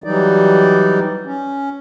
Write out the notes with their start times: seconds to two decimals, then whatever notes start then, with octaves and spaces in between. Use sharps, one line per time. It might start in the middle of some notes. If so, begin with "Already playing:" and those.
0.04 E3 F#3 G3 D#4 D5
1.25 C#4